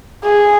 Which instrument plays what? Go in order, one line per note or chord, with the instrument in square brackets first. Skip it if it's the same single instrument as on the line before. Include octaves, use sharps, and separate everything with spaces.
[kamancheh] G#4